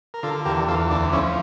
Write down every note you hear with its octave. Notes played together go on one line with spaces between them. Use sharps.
A#4
D3 F4 A4
E2 G4 A#4
E2 F4 A4
D2 D4
F3 C#4 E4